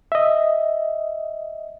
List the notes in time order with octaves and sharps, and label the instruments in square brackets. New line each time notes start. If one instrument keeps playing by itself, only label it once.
[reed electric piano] D#5 E5